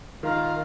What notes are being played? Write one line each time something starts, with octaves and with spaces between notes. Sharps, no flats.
D#3 F4 A#4 F5